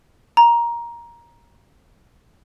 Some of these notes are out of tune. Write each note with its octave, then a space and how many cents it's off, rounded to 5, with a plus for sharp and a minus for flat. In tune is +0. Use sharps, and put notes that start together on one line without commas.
A#5 +15